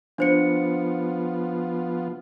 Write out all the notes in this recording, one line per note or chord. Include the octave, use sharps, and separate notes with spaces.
F3 B3 D4 F4 C5 C#7